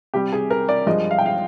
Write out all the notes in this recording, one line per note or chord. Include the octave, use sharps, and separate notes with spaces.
C3 G3 G4
G#4
A#4
D5
G2 F3 G#3 D#5
F5
G5
F5